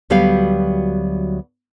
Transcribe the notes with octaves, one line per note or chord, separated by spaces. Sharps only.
D2 F#3 G3 B3 G4 F5